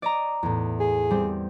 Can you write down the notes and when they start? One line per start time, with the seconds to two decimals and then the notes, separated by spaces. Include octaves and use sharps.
0.02 D5 D#5 A#5
0.43 E2 A2
0.80 G#4
1.10 G3 C4